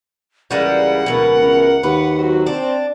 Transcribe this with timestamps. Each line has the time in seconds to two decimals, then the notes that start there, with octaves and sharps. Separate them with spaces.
0.51 C#2 E3 G3 G#3 A#3 E4 F#5
1.06 D1 B2 E3 A#4 B4
1.41 C#2
1.83 D#2 B4
2.16 F#3 C4 F#4
2.47 C4 D4